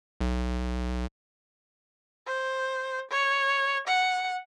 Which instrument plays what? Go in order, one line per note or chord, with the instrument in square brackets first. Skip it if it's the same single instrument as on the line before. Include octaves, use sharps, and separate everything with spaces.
[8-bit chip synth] B1
[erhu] C5
C#5
F#5